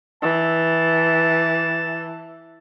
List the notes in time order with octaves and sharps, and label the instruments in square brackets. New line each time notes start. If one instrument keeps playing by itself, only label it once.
[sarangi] E3 [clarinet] A5